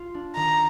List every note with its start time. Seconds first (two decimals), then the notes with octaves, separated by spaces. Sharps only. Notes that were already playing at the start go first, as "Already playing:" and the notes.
Already playing: F4
0.14 D4
0.36 D#3 A#5